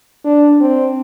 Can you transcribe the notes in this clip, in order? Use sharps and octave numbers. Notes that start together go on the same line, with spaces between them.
D4
C4